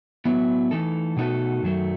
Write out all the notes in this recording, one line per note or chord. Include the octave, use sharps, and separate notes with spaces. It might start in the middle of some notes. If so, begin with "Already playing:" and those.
A2 F#3 B3 E4
E3 A3 D#4 A4
B2 A3 D#4 F#4 A4
F#2 D#3 F#3 A3